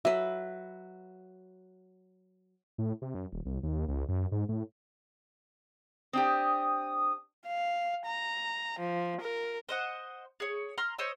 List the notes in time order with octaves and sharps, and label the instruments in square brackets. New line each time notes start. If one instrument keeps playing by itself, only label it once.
[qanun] F#3 B4 [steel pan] E5
[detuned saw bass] A2
C3
F#2
D#1
C2
D#2
C#2
F#2
G#2
A2
[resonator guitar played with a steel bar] C4 D4 G4 [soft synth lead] D#6
[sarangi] F5
A#5
F3
A#4
[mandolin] C5 D#5 F#5
G#4 C#5
A#5 C6 F6
C5 C#5 D#5 E6